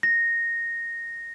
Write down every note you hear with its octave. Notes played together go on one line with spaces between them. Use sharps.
A#6